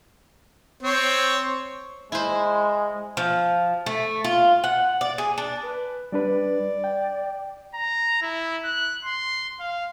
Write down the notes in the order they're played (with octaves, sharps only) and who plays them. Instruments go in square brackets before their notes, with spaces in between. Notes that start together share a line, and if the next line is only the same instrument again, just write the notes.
[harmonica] C4 C5 C#5
[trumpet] G#3 [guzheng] E4 C5
[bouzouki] F3
A3
F4
F#5
D5
G#4
D4
[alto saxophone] B4
[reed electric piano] G3 D4 B4 [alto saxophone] D5
[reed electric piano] G5
[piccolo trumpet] A#5
E4
F#6
C6
F5